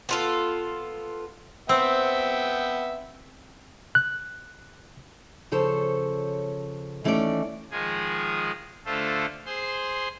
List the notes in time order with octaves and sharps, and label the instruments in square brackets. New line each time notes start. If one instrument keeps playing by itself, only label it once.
[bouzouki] B3 F4 A4
[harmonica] B3 E5 G5 [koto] C4
[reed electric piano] F#6
[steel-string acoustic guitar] C#3 F3 A4 C5 C#5
D#2 E3 A3 C#4 A#4 D5
[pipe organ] D#3 F3 G#3 G#4
D3 A3 F4 A4 C5
G#4 C5 C6